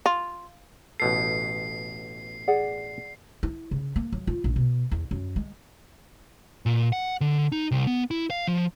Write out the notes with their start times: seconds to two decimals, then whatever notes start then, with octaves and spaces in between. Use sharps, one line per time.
0.06 F4
1.00 A1 B2 A4 C7
2.47 G#4 D5 F#5
3.43 E4
3.71 C#3
3.96 A#3
4.12 F#3
4.27 F4
4.44 A#1
4.56 B2
4.91 E2
5.11 F#2
5.36 G#3
6.66 A#2
6.93 F#5
7.21 D3
7.52 D#4
7.71 C2
7.87 B3
8.11 E4
8.30 F5
8.47 F3